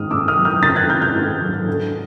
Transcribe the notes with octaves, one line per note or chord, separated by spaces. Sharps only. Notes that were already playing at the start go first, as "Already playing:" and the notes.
Already playing: G#2 D#3 D#6 F6
G#2 D6 E6
D#6 F6
F#3
F6 G6
D#3 G6 A6
F#6 G#6
G#2 F6 G6
F6 G6
G#2
F#3
D3